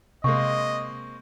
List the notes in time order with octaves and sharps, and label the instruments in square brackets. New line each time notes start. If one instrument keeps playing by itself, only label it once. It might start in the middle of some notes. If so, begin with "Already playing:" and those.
[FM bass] C3 [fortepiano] G#3 A#3 C4 [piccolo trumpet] D#5 [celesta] C#6